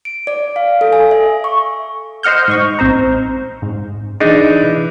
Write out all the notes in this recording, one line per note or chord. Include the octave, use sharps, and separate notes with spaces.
D7
D5
F5
A4
G#5
E5
C#6
C5 D#5 F#5 F6 G6
G#2 D#5 C#6
A#1 C4 C5 A#5
G#2
E3 D4 D#4 G#4 D#5